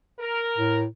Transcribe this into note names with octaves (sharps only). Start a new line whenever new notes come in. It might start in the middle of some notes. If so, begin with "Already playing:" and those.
A#4
A2